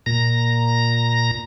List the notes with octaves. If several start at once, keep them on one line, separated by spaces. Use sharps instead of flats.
A#2 A#5 A#6